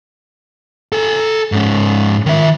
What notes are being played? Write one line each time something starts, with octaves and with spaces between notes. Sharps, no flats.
A4 G#5
G#2 C#4
D#3 E5